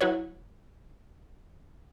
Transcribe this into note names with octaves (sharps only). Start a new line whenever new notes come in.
F#3 E4 F#4 B4 C#5